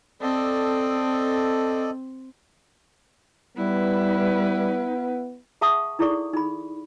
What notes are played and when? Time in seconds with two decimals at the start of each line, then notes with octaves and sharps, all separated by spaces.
0.22 C4 A4 D5 D#5
3.57 G3 B3 E4 B4
5.61 G#4 E5 F#5 A5 C#6 D#6
5.99 D#4 E4 G#4 A4 D5 C#6
6.33 D#4 G#4 B5